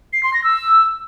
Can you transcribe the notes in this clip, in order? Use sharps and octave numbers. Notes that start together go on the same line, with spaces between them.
C7
C6
A#6
E6